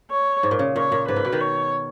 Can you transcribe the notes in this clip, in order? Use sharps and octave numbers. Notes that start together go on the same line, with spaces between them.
C#5
G#2
A#2
C#3
A#2 C#5
A#2
G#2 B4
A#2
B2
D#3
C#5